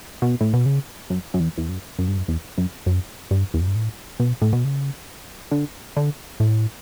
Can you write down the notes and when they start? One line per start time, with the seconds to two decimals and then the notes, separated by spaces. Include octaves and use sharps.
0.22 B2
0.41 A2
0.53 B2
0.66 C#3
1.10 F#2
1.34 F#2
1.40 E2
1.58 E2
1.69 F#2
1.98 F#2
2.08 G2
2.18 F#2
2.28 E2
2.58 F#2
2.86 F#2
3.31 G2
3.54 E2
3.61 F#2
3.68 G2
3.75 A2
4.20 B2
4.42 A2
4.53 B2
4.64 C#3
5.51 D3
5.97 D3
6.40 A2